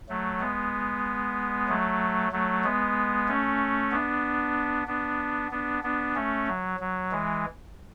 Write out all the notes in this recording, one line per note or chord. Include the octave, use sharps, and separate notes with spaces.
F#3 A3
G#3 B3
F#3 A3
F#3 A3
G#3 B3
A3 C#4
B3 D4
B3 D4
B3 D4
B3 D4
A3 C#4
F#3
F#3
E3 G#3